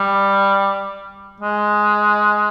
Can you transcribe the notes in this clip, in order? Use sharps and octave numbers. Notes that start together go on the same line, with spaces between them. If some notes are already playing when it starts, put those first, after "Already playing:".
Already playing: G3
G#3